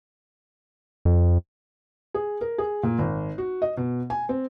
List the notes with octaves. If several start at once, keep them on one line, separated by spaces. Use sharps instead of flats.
F2
G#4
A#4
G#4
A#2
G#1
F#4
D#5
B2
G#5
C4